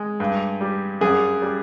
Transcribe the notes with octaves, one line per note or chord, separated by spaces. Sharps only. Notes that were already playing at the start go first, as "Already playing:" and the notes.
Already playing: G#3
G2
G3
F#2 G#4
G3